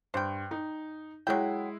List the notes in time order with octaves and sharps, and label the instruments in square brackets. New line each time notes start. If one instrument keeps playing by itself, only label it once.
[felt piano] G2 [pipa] C5 G5
[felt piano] D#4
[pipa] F#3 G5 [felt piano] G#3 E4